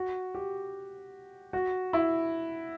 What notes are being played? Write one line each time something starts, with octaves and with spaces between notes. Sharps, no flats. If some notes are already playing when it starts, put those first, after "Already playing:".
Already playing: F#4
G4
F#4
E4